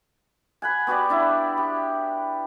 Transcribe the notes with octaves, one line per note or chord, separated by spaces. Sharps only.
B4 F#5 G#5
B3 F#4 G4 D5
D4 E4
G4